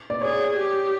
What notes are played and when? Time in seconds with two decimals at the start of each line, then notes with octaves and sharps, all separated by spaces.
0.10 D5
0.21 G#4 C#5
0.56 G4